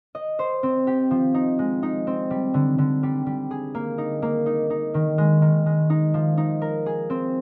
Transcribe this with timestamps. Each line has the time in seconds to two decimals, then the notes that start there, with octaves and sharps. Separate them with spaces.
0.15 D#5
0.39 C5
0.63 C4
0.87 G4
1.11 F3
1.34 D#4
1.59 G#3
1.83 D#4
2.07 C4
2.30 G3
2.54 D3
2.78 D3
3.03 G3
3.26 G3
3.51 G#4
3.75 A#3
3.98 D#4
4.22 A#3
4.46 D#4
4.70 D#4
4.94 D#3
5.18 G#3
5.42 D#3
5.66 G#3
5.90 D#4
6.14 F3
6.37 D#4
6.61 A#4
6.86 G#4
7.10 C4